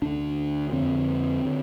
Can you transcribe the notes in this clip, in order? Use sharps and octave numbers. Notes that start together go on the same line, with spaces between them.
D2 D3 D4
F2 D3 C4
D3